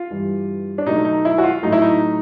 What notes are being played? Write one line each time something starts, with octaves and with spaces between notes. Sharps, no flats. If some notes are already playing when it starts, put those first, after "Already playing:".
Already playing: F4
G2 E3 G3
D4
B2 F#3 A3 D#4
D#4
E4
F#4
F4
A2 F#3 A3 D#4
E4
D#4